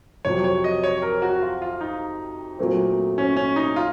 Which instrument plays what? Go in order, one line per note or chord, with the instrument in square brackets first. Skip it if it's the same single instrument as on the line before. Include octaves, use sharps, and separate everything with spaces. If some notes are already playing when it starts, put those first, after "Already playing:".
[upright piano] F2 C3 F#3 [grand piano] C#5
[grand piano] C#5
D#5
C#5
A#4
F#4
F4
F4
D#4
[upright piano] A#2 F#3 A3 C4
[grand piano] C#4
C#4
D#4
F4